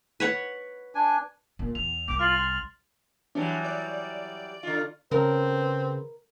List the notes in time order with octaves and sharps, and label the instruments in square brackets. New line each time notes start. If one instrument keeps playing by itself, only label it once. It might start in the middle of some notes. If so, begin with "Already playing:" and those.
[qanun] B4 C#5 F#5
[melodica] D4 G#5
[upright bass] D#2 A#2
[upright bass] E2 [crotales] F7
[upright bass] C2 [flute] D6
[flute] F4 [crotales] F6 A6 F#7
[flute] C6
[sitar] E3 F#3 G3 [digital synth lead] D4
[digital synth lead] D5
[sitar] D3 F4
[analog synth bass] C#3 [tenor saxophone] C4 [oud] A#4 [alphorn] B4